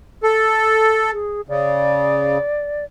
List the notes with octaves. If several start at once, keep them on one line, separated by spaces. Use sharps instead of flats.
A4
G#4
C#3 D5